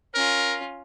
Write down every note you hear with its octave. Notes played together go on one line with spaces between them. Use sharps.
C#4 F4 A#4